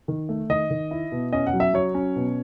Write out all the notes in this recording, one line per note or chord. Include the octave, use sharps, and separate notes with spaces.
D#3
A3
D#3 D#5
D#3
E4
B2
C#4 D#5
F#5
F#3
E5
F#3 C#5
C#4
B2